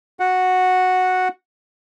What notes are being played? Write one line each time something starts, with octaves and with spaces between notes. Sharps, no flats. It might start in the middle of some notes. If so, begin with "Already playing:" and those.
F#4 F#5